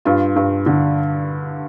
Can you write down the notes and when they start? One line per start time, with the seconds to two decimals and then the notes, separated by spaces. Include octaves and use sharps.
0.05 G2 F4
0.36 G2
0.66 D3